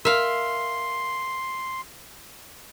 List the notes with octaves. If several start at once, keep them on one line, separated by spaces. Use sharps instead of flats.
A#4 E5 F5 C6